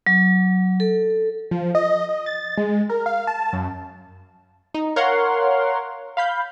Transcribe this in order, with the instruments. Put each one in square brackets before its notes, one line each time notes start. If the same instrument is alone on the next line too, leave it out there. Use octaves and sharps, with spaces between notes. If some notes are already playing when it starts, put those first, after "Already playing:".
[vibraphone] F#3
A4
[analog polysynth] F3
D#5
D#5
A6
G#3
A#4
F5
A5
F#2
D#4
A#4 C#5 F5 F#5 C6
F5 B5 G6